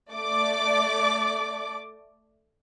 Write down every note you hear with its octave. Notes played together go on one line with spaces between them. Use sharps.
A3 D5 D6